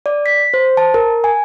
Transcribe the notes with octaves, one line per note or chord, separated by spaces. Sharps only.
D5
B6
C5
A5
A#4
G#5